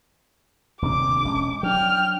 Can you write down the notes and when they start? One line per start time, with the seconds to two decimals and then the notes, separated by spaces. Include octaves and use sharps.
0.82 D#1 C3 D4 D6
1.24 E1 G#3 C#4
1.63 F#3 D4 G5 F6